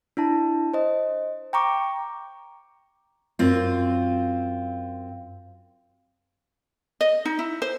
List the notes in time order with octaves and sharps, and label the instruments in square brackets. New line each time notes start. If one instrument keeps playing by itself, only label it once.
[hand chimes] D4 E4 A5
C5 D#5
G5 A#5 C#6 D6
[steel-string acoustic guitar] F#2 C4 F4
[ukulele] D#5
D#4
E4
C5